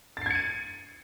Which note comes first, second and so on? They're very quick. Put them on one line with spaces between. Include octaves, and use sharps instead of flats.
A6 C7 G#6 C#7 D#7